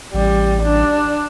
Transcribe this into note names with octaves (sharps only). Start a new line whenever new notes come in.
A1 G3
D4